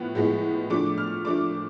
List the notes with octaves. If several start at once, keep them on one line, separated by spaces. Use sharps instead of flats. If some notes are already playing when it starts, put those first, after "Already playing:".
Already playing: A2 F3 B3 F#6
A2 F3 G#3 B3
F3 A3 D4 D6
F6
F3 A3 D4 D6